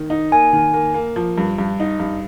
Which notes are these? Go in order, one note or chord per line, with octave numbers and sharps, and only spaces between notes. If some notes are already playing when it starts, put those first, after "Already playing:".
Already playing: D#3
D#4
A#3 G#5
D#3
A#3
A#3
F3
G2
G2
D#4
G2